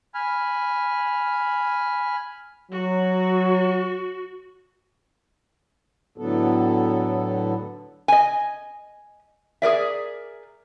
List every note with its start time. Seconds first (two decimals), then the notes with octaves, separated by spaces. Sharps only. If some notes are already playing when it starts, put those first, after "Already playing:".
0.14 G#5 B5 F6
2.71 F#3 F#4
6.18 A2 D3 F#3 B3 A4
8.08 D#5 G#5
9.62 G#4 A#4 D5 E5